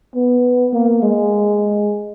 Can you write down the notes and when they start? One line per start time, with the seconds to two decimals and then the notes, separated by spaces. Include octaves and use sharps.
0.15 B3
0.73 A#3
1.02 G#3